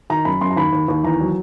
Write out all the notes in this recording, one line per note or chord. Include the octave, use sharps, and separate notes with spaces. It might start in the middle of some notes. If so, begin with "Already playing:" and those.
D#3 A#5
F#2 B5
F#2 C6
A#5
D#2 B5
D#2
D#2
E2 A#5
F#3